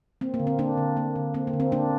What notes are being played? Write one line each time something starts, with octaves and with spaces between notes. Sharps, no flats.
A#3 C4
A#3
D3
C4
A#3 D4
D3
A#3
D3
A#3 C4
A#3
D3
C4
A#3 D4